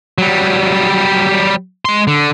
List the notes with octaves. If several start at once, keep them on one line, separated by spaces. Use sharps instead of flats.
F#3 G3
G#3 C6
D3